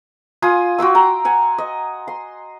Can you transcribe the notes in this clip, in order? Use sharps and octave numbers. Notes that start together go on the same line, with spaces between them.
F4 G#5 C6 D#6
F#4 G5 C6 E6
G5 A#5
F#5 G#5
D#5
C6